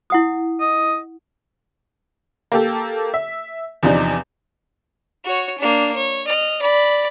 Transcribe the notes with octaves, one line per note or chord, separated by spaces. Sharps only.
E4 F#5 D#6
D#5
A#3 G4 A4
E5
E2 C3 F3 D4 D#4
F#4 C#5
A#3 D4
C#5
D#5 F6
D5 B5